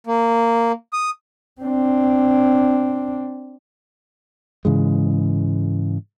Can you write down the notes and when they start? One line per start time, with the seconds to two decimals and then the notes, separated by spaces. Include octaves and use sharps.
0.07 A#3
0.93 D#6
1.61 C4 D4
4.65 G#2 C#3 E3 G#3